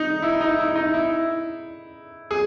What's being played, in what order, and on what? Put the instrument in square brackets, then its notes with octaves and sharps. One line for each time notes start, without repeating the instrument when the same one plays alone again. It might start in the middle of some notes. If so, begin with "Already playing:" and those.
Already playing: [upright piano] D#4
E4
D#4
E4
D#4
E4
G#4